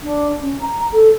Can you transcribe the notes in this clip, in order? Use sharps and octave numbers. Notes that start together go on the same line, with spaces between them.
D4
C#4
A#5
A4